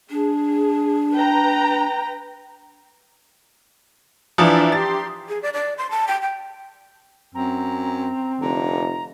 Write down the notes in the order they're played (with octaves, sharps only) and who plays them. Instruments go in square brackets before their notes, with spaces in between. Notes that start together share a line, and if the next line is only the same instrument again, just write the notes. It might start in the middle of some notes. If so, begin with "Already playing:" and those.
[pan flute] D4 [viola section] G#4
[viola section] B4 G5 A#5
[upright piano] E3 F3 [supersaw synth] D4 D5 E5 [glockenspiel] A#5 D#6
[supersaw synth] G4 C6 [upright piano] A6
[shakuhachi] G#4
D5
D5
C6
A5
G5
G5
[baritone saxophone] F#2 [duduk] C4 [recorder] A#5
[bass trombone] F1 [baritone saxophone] D3 [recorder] A#5